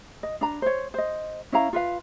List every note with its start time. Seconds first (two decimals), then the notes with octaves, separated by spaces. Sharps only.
0.23 D#5
0.41 D4 A#5
0.62 C5 C#5
0.94 C5 D#5
1.52 C#4 E4 F5 A#5
1.73 F4 B4 F5